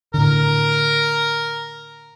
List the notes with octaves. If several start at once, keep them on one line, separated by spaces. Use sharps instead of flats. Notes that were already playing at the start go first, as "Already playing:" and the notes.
A2 D3 A#4